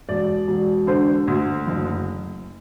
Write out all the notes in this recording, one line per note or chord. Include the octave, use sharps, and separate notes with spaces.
E1 D5
E1
D3 C5
D2
F#1